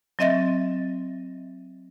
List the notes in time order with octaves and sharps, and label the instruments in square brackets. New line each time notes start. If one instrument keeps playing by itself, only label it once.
[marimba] F#3 C4 D#5 E5 A6 A#6